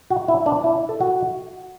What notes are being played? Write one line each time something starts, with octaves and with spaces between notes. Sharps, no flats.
F#4
E4
D4
E4
A4
F#4